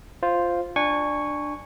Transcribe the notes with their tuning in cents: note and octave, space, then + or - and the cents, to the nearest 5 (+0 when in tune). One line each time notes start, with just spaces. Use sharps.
F4 +0 C5 +0
D4 +10 G#5 -20 C#6 +0